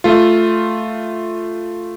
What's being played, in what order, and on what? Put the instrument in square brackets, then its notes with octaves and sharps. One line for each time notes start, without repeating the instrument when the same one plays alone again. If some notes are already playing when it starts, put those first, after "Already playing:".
[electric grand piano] A3 F4